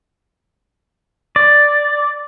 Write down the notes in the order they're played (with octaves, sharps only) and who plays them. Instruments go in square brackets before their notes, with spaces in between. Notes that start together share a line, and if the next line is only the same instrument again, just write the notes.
[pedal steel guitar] D5